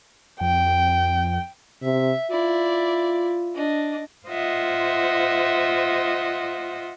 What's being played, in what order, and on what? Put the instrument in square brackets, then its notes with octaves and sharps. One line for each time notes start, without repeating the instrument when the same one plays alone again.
[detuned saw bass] F2 [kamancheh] G5
[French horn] C3 [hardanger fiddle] E5
[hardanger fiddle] E4 D5 [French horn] F4
[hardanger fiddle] D4 D#5
[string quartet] F4 C5 D#5 E5 F#5